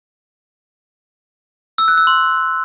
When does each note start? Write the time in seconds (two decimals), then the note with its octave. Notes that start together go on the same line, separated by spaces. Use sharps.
1.78 E6
1.88 F#6
1.98 E6
2.07 C6